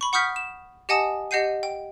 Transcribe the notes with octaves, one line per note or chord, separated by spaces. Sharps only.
B5 C#6
F#5 C#6 D#6 F6 G6 B6
E7
G4 D#5 F#5 G#5 A5 D#6
G4 D#5 F#5 G6 C7 D#7
G5